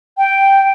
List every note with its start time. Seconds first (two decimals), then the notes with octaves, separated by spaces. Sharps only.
0.18 G5